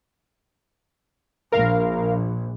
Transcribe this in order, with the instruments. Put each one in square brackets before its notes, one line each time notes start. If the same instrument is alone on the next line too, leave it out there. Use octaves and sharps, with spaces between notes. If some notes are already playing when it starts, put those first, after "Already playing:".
[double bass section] A#1 [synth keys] A#4 F5